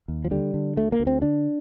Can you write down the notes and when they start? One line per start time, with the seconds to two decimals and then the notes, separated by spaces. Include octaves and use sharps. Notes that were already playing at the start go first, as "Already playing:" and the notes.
0.08 D#2
0.25 F3
0.31 D3 G3
0.54 D3
0.77 D2 A3
0.92 A#3
1.00 D2
1.07 C4
1.22 D3 D4